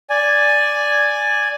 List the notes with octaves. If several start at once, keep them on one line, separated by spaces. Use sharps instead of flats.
D5 G#5